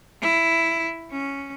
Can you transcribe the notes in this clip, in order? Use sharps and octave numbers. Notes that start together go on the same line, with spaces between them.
E4
C#4